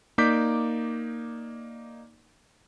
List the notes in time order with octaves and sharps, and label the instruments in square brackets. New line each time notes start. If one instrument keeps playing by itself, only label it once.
[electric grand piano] A#3 D#4 D5 D6 G6 B6